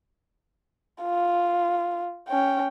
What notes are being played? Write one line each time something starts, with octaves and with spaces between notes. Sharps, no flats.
F4
C#4 G5